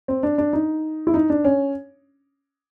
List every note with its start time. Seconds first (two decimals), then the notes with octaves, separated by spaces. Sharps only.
0.08 C4
0.23 D4
0.38 D4
0.53 D#4
1.07 E4
1.14 D#4
1.30 D4
1.45 C#4